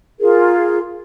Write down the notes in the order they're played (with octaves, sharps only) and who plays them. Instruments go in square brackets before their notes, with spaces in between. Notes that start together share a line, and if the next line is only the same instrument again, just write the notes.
[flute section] F4 G#4 A#4